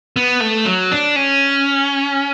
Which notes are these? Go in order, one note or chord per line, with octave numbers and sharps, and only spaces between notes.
B3
A3
F#3
D4
C#4